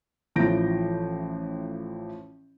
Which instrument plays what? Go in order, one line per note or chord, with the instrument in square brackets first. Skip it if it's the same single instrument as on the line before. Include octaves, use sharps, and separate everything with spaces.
[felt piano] A1 E3 F3 G6 A#6 D7